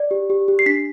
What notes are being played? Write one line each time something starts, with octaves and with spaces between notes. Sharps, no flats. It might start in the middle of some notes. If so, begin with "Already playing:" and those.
Already playing: D5
G4
G4
G4
C7
D4 B6